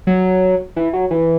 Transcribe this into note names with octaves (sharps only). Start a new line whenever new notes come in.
F#3
E3
F#3
E3